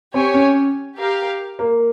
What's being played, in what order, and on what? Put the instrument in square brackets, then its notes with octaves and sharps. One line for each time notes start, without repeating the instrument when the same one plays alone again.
[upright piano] C4 [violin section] G4 C#5 G#5
[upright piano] C#4
[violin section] G4 A#4 F5
[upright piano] A#3